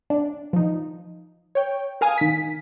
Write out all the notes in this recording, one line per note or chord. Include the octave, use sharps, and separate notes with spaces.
D4
F3 D#4
C#5 G5
A#4 F5 G#5 D#6
D#3 B6